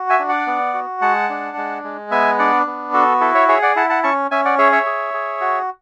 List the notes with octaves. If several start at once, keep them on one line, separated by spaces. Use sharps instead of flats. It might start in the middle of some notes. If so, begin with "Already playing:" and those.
Already playing: F#4
E5 G#5
D4
D5 F#5
B3
F#4
G#3 F#5 A5
D4
G#3
G#3
B3 E5 G#5
D4 D5 F#5
B3
F#4 A4
E4 A4
C#5 E5
G#4 C#5 E5
D5 F#5
E4 F#5 A5
F#5 A5
C#4 A5 C#6
C#4 E5 G#5
D5 F#5
G#4 C#5 E5
C#5 E5
G#4
G#4
F#4